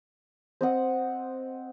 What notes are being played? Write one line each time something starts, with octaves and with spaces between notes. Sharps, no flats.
C4 D#5 F#5